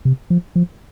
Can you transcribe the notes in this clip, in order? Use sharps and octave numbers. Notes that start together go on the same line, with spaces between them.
C3
F3
F3